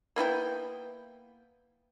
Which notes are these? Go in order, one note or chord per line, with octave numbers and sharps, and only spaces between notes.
A#3 B3 E4 G5